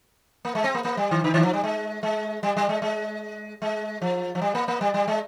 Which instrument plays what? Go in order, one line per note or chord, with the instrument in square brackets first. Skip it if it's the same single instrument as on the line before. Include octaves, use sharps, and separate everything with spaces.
[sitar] A#3
G#3
C4
A#3
A#3
G3
D#3
D3
D#3
F3
G3
G#3
G#3
G3
G3
G#3
G#3
G#3
F3
F3
G3
A#3
A#3
G3
G3
G#3